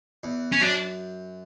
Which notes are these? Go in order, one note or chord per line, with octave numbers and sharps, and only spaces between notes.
E2
C#4
F#2 D4